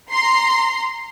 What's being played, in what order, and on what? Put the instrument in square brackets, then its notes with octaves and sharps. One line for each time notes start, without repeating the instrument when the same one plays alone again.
[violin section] A#5 C6